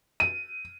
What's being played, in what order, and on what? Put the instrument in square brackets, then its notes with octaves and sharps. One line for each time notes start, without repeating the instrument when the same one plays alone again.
[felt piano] D#7